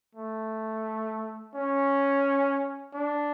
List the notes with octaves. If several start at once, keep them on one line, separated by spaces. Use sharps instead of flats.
A3
C#4
D4